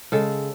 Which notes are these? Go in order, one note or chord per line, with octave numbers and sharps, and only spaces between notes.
C#3 G#3 A4